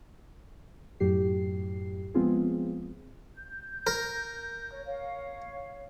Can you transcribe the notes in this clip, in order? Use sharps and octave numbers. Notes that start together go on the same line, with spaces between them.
F#2 A2 F#3 G4 C7
F3 G#3 B3 C4 F4 G#4
G6
A#4
C#5
C#5 F5